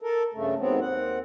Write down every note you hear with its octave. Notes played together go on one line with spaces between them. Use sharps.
A4 A#4
G2 C#3 A3
D#2 G#2 F#3 B3 C4
D#2 C4 F#5